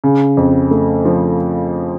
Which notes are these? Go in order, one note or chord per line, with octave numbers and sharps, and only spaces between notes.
C#3
F2
A3
F3